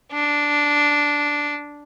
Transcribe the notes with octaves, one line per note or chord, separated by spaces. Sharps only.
D4